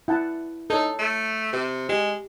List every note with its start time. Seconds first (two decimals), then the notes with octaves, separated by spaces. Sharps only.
0.08 E4 F#5 A5
0.70 D#4 A4 C#5
0.99 A3
1.53 C3
1.89 G#3 G4